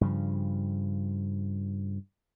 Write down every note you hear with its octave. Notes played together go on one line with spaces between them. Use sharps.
G2 C#3 F3